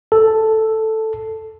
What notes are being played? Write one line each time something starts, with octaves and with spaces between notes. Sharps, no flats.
A4